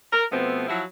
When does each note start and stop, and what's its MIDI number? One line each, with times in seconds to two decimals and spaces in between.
0.12 0.25 70
0.32 0.66 47
0.32 0.66 53
0.32 0.66 57
0.32 0.66 59
0.32 0.66 60
0.69 0.83 53
0.69 0.83 54
0.69 0.83 64
0.69 0.83 66